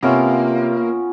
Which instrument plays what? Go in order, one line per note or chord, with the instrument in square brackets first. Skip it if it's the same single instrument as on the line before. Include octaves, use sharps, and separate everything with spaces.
[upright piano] C3 [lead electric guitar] A#3 [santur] B3 C#4 F4